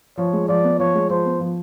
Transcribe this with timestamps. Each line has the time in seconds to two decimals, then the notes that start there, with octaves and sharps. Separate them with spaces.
0.18 F3 C#5
0.33 G#3
0.48 F3 D5
0.64 B3
0.79 F3 C#5
0.95 G#3
1.10 F3 C5
1.26 B3
1.40 F3